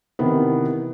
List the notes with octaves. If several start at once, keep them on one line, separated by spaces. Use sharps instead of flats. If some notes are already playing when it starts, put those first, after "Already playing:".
C3 D#3 E3 B3